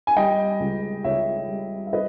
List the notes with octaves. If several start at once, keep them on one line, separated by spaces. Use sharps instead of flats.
G#5
G3 D#5 G5
C#2
C#2 C#5 E5
G3
E5
B4 D#5